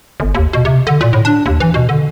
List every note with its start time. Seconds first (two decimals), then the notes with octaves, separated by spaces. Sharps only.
0.20 G1
0.35 D#2
0.53 B2
0.65 C3
0.87 D3
1.01 A#2
1.13 A2
1.25 D4
1.46 D#2
1.60 E3
1.74 B2
1.89 D3